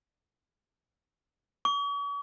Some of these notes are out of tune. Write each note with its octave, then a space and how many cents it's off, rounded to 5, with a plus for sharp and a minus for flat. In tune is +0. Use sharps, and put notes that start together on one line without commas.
C#6 +45